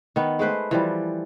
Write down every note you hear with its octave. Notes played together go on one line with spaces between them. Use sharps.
D#3 B3
G#3 A3 B4 C5
E3 F3 G3